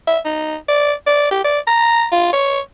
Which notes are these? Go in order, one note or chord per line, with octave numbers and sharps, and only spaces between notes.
E5
D#4
D5
D5
G4
D5
A#5
F4
C#5